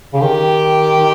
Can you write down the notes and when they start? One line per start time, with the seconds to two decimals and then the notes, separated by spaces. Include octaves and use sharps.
0.13 C#3
0.20 D#3 G4